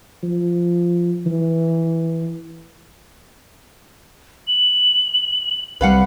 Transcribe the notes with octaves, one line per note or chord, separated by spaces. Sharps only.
F3
E3
F#7
C2 G3 B4 F5 F#5